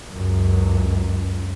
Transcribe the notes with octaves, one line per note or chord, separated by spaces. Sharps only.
C#2 F#2